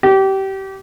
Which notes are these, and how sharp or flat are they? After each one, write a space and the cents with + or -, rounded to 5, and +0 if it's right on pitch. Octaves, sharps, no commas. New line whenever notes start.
G4 -25